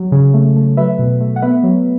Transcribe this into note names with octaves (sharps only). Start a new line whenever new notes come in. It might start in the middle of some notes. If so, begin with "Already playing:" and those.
Already playing: F#3
C#3
A3
A3
F#3 B4 E5
B2
A3
F#5
B3 B4 E5
F#3